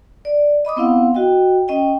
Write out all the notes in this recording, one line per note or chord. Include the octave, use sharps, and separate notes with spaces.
D5
D#5 B5 D6 D#6
B3 C4 E4 F5 F#5
F#4 D#5 G5
C#4 D#5 G5